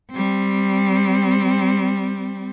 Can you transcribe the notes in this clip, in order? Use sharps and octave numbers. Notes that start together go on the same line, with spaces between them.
G3 C4